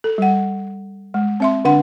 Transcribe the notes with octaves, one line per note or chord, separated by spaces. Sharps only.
A4
G3 F#5
G#3
C4 E5 C6
D3 D4 F#5 C6